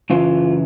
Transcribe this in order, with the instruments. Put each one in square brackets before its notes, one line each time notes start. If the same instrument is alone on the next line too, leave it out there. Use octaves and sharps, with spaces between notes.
[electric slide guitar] F#2 C#3 E3 F4